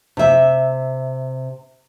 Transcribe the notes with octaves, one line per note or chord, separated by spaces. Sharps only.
C3 E5